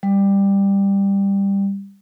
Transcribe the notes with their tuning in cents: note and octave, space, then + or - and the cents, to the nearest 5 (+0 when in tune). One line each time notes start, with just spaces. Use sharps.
G3 +15